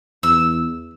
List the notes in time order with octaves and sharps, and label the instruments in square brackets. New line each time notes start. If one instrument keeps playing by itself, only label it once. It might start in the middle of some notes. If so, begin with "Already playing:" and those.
[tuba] E2 [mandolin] E6